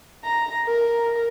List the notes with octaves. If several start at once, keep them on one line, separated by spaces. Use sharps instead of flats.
A#5
A#4